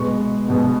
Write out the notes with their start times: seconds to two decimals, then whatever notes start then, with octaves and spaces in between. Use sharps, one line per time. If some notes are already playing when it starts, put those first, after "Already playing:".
Already playing: B2 G#3 B3 C#6
0.48 B2 G#3 B3